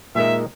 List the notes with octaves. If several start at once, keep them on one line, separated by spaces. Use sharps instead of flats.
A#2 G#3 D#4 A#4 D#5 E5